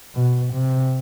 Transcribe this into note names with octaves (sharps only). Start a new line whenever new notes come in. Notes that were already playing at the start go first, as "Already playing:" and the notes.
B2
C3